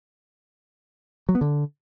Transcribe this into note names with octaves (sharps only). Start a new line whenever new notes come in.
F#3
B3
D3